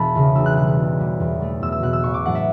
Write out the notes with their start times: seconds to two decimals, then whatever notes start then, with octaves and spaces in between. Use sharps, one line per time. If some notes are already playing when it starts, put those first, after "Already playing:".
Already playing: E1 A5 B5
0.15 E2 C#3
0.35 B1 E6
0.46 F#6
0.57 B2 G3 F#6
0.67 F#6
0.77 B1
0.99 B2 G3
1.20 E2
1.40 B2 A3
1.62 E2 E6
1.72 E6
1.82 B2 A3 F#6
1.93 E6
2.04 A1 C#6
2.14 D6
2.25 A2 F#3 A3 F#5
2.35 E5